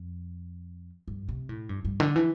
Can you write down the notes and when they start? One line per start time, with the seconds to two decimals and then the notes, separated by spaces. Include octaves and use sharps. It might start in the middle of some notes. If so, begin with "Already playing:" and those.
Already playing: F2
1.08 G2
1.29 C3
1.49 A2
1.69 G2
1.85 G2
2.00 D3
2.16 E3